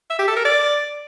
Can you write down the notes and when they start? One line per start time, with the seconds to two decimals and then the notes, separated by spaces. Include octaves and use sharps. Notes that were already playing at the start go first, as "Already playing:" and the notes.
0.10 E5
0.19 G4
0.28 A4
0.36 A#4
0.45 D5